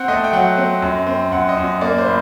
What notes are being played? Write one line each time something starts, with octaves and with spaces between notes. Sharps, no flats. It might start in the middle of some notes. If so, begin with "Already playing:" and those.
Already playing: C4 F#5
A3 D#5
G5
F#3 F#5
C4
F#2
C4
F#2 F#5
D#5
F#2
D#5
A#3 D5
C5
A2